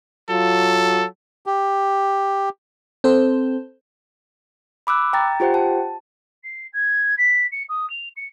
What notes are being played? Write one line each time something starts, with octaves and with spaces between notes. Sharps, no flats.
F#3 F4 A4
G4
C4 A4 C5
B5 D6 E6 F#6
G5 A#5 A6
F4 G4 C5 F#5 G5
A5
C7
G#6
B6
C#7
D#6
F7
C#7